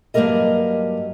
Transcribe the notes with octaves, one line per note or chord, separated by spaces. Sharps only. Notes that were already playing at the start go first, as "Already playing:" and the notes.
G2 F#3 A#3 G4 A#4 D#5